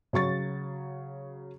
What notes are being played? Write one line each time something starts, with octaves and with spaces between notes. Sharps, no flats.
C#3 F#3 C#6 A6